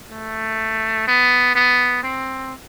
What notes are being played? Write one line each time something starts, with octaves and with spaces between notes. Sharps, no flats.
A3
B3
B3
C4